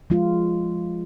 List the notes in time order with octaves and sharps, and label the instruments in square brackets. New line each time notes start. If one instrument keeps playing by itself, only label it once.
[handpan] F3 G#3 F4